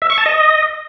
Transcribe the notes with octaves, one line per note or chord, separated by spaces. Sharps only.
E5
C#6
A5
D#5